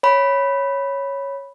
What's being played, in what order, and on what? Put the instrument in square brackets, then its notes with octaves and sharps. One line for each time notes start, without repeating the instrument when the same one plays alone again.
[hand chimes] C#5 B5